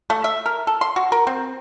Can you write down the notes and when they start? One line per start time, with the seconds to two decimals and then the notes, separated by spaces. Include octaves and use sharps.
0.10 A3
0.24 E5
0.46 A#4
0.67 A4
0.81 C6
0.96 F#4
1.12 A#4
1.27 C4